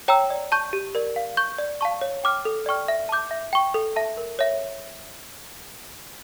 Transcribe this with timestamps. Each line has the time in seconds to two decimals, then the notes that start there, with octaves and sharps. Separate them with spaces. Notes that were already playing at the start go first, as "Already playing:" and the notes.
0.08 C#5 G5 A#5 E6
0.30 D5
0.52 A5 C#6 G6
0.73 G4
0.95 A#4 D5
1.16 F5
1.37 C#6 G6
1.58 D5
1.81 F5 A5 C#6
2.01 C#5
2.24 G5 D6 F6
2.45 A4
2.66 D5 G5 C#6 F6
2.88 E5
3.09 A5 D6 G6
3.31 E5
3.53 G5 C#6
3.74 A4
3.96 E5 A5
4.17 A#4
4.39 C#5 E5